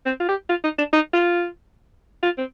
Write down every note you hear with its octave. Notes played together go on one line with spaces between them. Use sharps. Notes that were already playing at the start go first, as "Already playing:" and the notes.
C4
F4
G4
F4
D#4
D4
D#4
F4
F4
C4